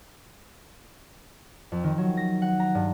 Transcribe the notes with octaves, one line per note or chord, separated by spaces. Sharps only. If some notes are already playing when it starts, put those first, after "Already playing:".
F2
D#3
F#3
A#6
F#5
A#5
G2